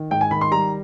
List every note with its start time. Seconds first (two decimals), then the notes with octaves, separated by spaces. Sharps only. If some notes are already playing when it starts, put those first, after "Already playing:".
Already playing: D#3
0.11 G#2 G5
0.21 G#5
0.31 D#3 B5
0.41 C6
0.51 G3 A#5